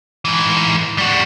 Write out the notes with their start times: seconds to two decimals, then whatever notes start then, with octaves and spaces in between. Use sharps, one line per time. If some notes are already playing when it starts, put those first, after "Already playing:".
0.25 G#2 E3
0.98 G3 F#4